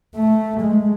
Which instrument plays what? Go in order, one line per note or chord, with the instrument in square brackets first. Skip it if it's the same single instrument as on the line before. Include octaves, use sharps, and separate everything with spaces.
[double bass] A3
G#3